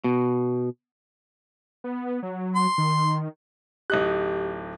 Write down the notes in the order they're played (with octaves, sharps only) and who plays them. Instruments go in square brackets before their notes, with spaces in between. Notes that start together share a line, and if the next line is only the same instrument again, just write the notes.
[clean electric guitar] B2
[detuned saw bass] B3
F#3
[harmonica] C6
[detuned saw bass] D#3
[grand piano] D1 D#4 F#6 [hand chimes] G4